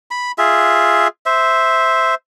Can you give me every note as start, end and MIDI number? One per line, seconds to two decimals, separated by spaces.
0.11 0.32 83
0.38 1.08 65
0.38 1.08 68
0.38 1.08 76
1.26 2.14 72
1.26 2.14 76